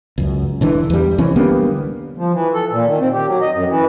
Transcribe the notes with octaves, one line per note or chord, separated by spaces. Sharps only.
C#2 F#2
E1 D3 E3
E2 G3
C2 E3 C#4
D3 G3 A#3 B3
F3
E3
A4
A#2
D#3
C4
G4
F#3
D#5
F#2
E3